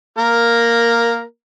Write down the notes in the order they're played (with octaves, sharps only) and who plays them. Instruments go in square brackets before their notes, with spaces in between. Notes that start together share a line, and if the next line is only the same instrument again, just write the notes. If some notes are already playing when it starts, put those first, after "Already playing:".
[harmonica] A#3 A#4